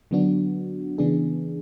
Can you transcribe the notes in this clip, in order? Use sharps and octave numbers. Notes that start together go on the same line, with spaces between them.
D3 F#3 B3 D4 F#4
C#3 E3 B3 D4 G#4